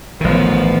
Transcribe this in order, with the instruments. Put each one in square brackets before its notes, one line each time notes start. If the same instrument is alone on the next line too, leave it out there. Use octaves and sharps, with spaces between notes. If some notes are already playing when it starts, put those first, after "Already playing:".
[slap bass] A1 D#3 [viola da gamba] F3 B3